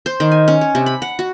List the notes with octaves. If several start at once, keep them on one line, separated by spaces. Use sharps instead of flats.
C5
D#3
G#5
C#4
C#5
C3
B5
F#5
F#4